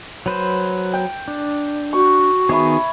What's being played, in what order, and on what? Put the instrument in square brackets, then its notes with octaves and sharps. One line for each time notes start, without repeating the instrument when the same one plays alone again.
[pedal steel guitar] F#3 B4 C5
[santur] G5
[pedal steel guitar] D4
[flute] F#4 [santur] C#6
[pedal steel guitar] D#3 B3 G#4 [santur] C#5 E5 B5